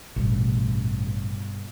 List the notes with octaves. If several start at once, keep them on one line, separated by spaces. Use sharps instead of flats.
A1 G2 B2